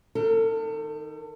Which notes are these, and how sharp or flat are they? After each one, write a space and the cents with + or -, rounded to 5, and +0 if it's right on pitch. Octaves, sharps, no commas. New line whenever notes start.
D#3 +0 A4 +35